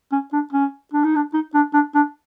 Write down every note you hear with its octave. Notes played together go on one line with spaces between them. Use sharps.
C#4
D4
C#4
D4
D#4
D4
D#4
D4
D4
D4